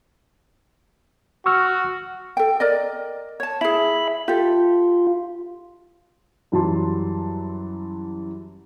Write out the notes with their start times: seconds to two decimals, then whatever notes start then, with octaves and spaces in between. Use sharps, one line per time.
1.46 F#4 C#6 E6 F6
2.37 A4 G5
2.60 A#4 D5 D#5
3.40 C#5 A5
3.61 E4 G#4 E5 B5
4.28 F4 G4 A4
6.52 F#2 E3 F#3 G3 A5 C6